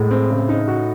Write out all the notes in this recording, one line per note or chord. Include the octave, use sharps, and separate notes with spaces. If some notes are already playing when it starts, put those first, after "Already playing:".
Already playing: A2 G#3
C4
C#3
D#4
F#4